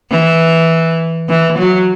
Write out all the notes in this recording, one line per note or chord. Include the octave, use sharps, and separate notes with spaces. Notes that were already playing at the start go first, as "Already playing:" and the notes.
E3
E3
F#3